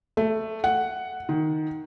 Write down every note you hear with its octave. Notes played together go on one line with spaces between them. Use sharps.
A3
F#5
D#3